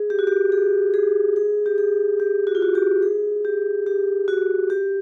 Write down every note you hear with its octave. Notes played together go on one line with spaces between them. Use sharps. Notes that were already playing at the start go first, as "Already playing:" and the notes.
Already playing: G#4
G4
F#4
G4
G#4
G#4
G#4
G4
G#4
G4
F#4
F4
F#4
G4
G#4
G4
G4
F#4
G4